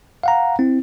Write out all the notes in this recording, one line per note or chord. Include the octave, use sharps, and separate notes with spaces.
F5 F#5 A#5
C4 E4